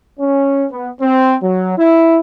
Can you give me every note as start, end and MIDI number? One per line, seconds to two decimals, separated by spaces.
0.19 0.64 61
0.70 0.89 59
1.01 1.35 60
1.41 1.74 54
1.77 2.20 64